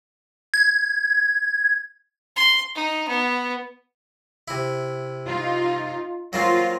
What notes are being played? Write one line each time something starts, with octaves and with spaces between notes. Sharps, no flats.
G#6
C6
D#4
B3
C3 E4
D#4 F4
F#3 A#3 C4 F4